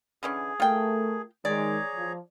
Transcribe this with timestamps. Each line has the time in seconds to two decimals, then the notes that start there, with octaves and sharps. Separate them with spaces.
0.23 D3 E3 C#4 G#4
0.60 A3 F4 A#4 G5
1.45 D#3 G#3 G#4 C#5 D5 A#5
1.96 F3